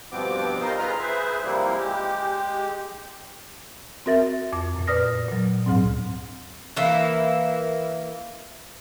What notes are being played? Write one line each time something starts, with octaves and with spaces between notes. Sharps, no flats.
G2 B2 F3 B3 C4 D6
G3 D#4 F4 A#4 C5 D#5
F4 G#4 B4 A#5 F6
G#4 B4 C5 E5
C3 F3 G3 A#3 E4
G#3 G4
C4 F#4 A#4 E5 A6
F2 D6
F#2 A#2
B4 D5 D#6 F6 A#6
A#2 F#3
D2 G#2 F#3 C4
E3 A#3 E4